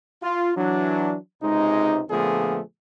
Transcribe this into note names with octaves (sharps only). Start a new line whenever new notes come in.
F4
E3 F#3 D4
C#2 C3 G#3 D#4
A#2 D3 F3 A3 B3 G#4